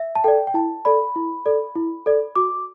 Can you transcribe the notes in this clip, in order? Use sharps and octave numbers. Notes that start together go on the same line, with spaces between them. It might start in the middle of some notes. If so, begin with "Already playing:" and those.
Already playing: E5
A5
A4 D5 G5
G5
E4 A5
A4 D5 B5
E4
A4 D5
E4
A4 D5
F#4 D6